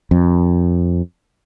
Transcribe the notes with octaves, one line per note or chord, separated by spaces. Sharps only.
F2